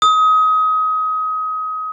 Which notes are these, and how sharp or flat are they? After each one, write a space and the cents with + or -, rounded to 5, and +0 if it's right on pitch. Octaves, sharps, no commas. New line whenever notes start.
D#6 +25